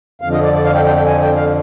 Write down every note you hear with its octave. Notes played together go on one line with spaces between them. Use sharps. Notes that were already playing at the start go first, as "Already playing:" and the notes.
F2 D3 F3 F5
D#5
D5
D5
F5
G5
G5
G5
G#5
G5
F5